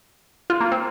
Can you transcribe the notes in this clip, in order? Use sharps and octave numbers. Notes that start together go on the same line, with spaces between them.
F4
A#3
C4